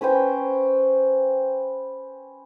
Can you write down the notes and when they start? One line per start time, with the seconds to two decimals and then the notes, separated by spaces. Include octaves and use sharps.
0.01 C#4 B4 C5 G5